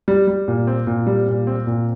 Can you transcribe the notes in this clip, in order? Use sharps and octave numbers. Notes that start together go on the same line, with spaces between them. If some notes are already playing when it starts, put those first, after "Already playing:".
G3
G3
A#2
C4
A#2
G3
A#2
C4
A#2